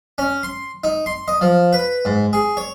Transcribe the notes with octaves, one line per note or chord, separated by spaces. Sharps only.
C#4
C6
D#4
C6
D#5
F3
B4
G#2
G#4
C#5